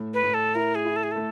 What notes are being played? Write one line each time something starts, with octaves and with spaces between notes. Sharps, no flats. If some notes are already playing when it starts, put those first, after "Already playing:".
Already playing: A2
B4
A2
A4
E4 A#4
G#4
E4
A4
G#4
A3 A4